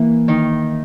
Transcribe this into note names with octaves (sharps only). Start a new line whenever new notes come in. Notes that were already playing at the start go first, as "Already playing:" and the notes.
Already playing: E3 A#3 E4
D#3 D#4